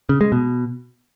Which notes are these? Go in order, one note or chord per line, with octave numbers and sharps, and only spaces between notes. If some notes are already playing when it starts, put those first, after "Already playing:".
C#3
G#3
B2